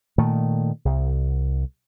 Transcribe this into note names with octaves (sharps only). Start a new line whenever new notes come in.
A#2 D#3 A3
C2